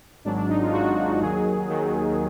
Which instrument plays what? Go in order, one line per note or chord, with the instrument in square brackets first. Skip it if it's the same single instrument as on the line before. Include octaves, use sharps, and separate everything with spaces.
[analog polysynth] G#1 G#2 F#3 D4
D4
D#4
F4
G#1 G#2 F#3 F#4
D#2 D#3 F#3 G#4
D#2 D#3 F#3